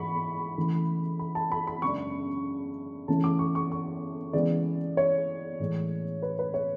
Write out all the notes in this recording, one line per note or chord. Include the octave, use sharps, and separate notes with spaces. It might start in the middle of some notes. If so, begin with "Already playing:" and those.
Already playing: G#2 E3 B5 C#6
C#3 E3 A3
B5
A5
B5
B5
F#2 C#3 G#3 D4 C#6
C#3 E3 A3 C#4 A5
D6
C#6
C#6
C#6
C#3 E3 G#3 B3 D5
C#5
A2 E3 G#3
B4
B4
C#5